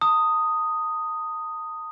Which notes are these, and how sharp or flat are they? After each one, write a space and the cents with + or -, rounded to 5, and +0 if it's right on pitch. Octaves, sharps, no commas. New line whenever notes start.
A5 +45 D#6 +0